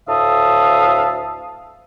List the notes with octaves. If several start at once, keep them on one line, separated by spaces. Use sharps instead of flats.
D2 A2 E5 F5 A5 D#6